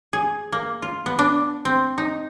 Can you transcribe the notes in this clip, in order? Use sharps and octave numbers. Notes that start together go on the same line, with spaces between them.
G#4
A#3
F4
B3
D4
C4
D#4